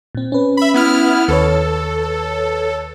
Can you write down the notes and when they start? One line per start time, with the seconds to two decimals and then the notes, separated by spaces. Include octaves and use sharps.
0.15 A#2 C4
0.32 C#4 B4
0.57 E5 B5
0.74 B3 E4 F6
1.28 D#2 A4 B4 C#5